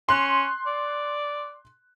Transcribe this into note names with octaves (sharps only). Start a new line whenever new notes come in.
C#4 C6 F#6
D5